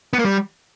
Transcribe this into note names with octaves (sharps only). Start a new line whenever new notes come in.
B3
A#3
G3